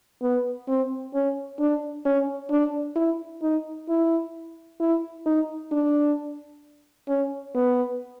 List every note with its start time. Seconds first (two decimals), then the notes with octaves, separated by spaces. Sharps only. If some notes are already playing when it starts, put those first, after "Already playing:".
0.22 B3
0.68 C4
1.14 C#4
1.60 D4
2.06 C#4
2.50 D4
2.96 E4
3.42 D#4
3.89 E4
4.80 E4
5.26 D#4
5.72 D4
7.08 C#4
7.55 B3